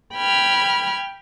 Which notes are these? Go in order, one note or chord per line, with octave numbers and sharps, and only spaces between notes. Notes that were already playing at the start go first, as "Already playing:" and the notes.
G5 B5 F6 G#6